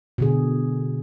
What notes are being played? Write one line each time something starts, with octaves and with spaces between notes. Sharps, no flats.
B2 D3 G#4